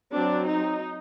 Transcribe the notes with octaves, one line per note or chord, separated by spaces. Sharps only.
F#3 C4 D4
D#4